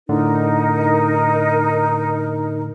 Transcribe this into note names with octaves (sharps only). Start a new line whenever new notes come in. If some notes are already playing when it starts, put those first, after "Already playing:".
A2 D3 D#4 A#4